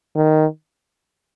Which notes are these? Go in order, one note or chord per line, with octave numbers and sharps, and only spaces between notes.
D#3